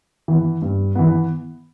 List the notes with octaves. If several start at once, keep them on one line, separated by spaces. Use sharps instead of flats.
E3 B3
G2
E3 B3